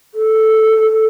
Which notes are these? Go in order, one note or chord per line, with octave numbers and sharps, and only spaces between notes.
A4